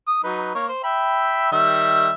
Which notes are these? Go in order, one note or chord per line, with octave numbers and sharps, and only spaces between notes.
D#6
F#3 D#4 B4
A#3 C#5
C5
E5 G5 B5
D#3 G3 E5